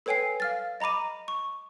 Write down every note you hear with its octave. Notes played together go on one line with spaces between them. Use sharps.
A4 B4 C#5 G5 G#5 C7
F5 F6 A6
D#5 A#5 B5 D6 D#7
C#6